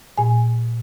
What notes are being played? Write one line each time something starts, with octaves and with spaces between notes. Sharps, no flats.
A#2 G#5